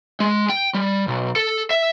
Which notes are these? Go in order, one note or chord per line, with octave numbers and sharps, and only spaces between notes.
G#3
G5
G3
B1
A4
E5